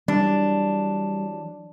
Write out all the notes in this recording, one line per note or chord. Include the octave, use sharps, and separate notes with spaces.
E3 F#3 G3 D4